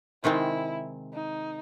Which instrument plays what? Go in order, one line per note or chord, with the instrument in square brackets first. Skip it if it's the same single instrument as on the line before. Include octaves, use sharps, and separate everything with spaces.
[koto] C3 D#3 G#3 C4 [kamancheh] E4
[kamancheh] D#4